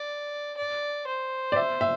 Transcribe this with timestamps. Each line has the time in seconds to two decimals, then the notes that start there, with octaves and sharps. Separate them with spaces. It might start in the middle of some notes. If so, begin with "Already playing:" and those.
Already playing: D5
0.57 D5
1.07 C5
1.52 D5
1.56 E5
1.81 E5